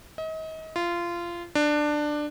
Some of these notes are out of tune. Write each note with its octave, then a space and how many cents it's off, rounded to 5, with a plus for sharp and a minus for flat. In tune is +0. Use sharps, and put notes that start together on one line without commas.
D#5 +35
F4 -20
D4 +15